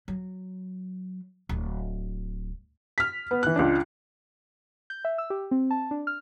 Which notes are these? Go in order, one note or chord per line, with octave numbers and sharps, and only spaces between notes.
F#3
D1
F6 B6
B3
E3 F#6
C#2 D4
G6
E5
E6
G4
C4
A5
D4
F6